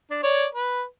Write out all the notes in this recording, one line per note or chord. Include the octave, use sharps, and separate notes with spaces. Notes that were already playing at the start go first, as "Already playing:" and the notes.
D4
C#5 D5
B4